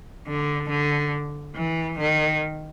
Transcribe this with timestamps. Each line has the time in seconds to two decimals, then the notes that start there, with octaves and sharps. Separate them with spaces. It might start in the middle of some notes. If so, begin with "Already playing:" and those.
0.27 D3
0.70 D3
1.55 E3
1.99 D#3